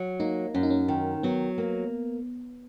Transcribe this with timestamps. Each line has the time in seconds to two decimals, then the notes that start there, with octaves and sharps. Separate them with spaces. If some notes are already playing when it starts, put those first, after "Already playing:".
Already playing: F#3
0.20 A#3 D#4
0.54 F#2 C#4
0.63 D#4
0.70 C#4
0.88 D#3
1.23 F#3 B3
1.58 A#3